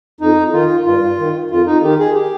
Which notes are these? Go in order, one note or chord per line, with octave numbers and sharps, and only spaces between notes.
F2 D#4
D#3 F4
G2 F4
D#3
F2 F4
D#4
D#3 G4
G#4
G4